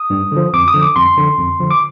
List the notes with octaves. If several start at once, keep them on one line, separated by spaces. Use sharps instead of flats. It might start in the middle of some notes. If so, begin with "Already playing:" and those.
Already playing: D#6
G2
D3 F3
F2 D6
D#6
D3 F3
D6
F2 C6
D3 F3
F2
D3 F3
D6